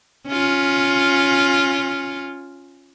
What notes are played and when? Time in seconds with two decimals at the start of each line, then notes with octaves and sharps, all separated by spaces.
0.27 C#4 F4